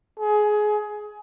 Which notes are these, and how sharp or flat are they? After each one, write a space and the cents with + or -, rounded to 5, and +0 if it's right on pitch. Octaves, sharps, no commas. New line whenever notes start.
G#4 +20